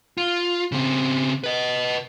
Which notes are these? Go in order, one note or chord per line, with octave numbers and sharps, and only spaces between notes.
F4
C#3 C4
B4 D#5